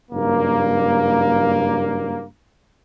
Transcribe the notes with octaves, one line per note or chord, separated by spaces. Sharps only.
F#1 G2 A#3